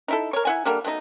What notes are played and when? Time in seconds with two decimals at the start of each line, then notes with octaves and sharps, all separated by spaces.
0.08 D#4 E4 A4
0.33 A#4 C#5
0.45 E4 F#5 G#5
0.65 D3 G3 A#3
0.84 B2 A3 C4 D#4